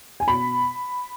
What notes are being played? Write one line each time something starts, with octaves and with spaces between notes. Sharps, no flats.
G#5
B2 B5